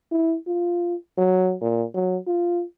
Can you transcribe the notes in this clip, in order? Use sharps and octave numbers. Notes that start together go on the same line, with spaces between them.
E4
F4
F#3
A#2
F#3
F4